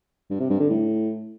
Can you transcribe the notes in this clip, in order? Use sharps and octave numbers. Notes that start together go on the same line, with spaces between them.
G2
C3
G2
D3
A2